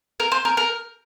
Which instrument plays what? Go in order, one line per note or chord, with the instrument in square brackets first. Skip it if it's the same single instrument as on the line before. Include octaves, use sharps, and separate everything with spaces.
[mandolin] A#4
C5
A#4
A#4